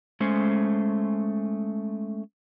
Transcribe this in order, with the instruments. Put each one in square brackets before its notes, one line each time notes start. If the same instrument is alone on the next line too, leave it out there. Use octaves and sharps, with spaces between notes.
[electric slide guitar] G#3 A3 C#4 C5